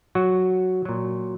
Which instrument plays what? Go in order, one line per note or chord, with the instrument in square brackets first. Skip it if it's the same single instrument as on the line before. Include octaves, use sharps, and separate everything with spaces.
[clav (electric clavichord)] F#3 F#4
A#2 F#3